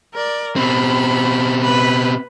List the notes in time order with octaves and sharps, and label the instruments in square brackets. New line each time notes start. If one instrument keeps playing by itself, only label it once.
[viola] A#4 D5
[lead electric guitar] B2 C4 [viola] B5
[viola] B4 B5